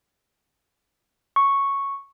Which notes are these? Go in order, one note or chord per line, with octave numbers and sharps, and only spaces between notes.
C#6